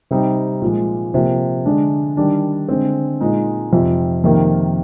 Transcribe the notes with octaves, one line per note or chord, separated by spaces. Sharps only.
C3 G3 C4 D#4
A#2 F3 G#3
C3 F3 A#3
D3 G#3 D4
D#3 G3 D4
D3 G#3 C4
A#2 G#3 D#4
F2 C3 F3
F2 C3 D#3 A#3